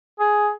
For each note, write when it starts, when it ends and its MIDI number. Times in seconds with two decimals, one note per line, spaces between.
0.20 0.50 68